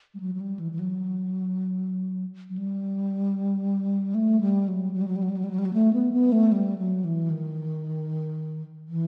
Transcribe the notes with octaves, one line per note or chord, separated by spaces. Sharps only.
G3
F#3
F#3
G3
E3
E3
F#3
F#3
G3
A3
G3
F#3
F#3
G3
F#3
G3
F#3
G3
F#3
G3
F#3
G3
F#3
A3
B3
B3
A3
G3
F#3
E3
D#3
E3